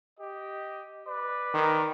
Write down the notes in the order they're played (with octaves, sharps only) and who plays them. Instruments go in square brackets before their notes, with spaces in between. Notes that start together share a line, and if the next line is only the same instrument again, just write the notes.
[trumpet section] G4 D#5
B4 D5
[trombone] D#3